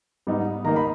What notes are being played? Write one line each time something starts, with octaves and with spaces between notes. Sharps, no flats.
G#2 G3 B3 D#4
D#3 A#3 D#4 A#5
B5